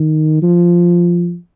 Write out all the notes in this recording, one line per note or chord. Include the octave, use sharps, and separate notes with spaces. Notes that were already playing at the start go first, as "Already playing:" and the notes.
Already playing: D#3
F3